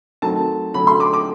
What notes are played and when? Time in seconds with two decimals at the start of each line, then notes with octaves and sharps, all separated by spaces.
0.22 D#3 F#3 A3 C4 A5
0.74 D3 F#3 A3 C#4 B5
0.87 C6
1.00 D6
1.13 D6